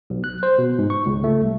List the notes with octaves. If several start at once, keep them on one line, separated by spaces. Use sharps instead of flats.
B1
F#6
C5
B2
G#2
C#6
C#2
A3
C2